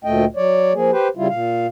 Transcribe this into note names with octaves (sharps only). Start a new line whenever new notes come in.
D2 A#2 A3 D#5 G5
F#3 C#5 D5
F3 A#3 G#4
G4 B4 C5
C#3 G3 E4 F4
A#2 F5